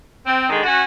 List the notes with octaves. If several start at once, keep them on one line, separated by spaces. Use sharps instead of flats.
C4
D3 D#3 G#3
C#4 F#4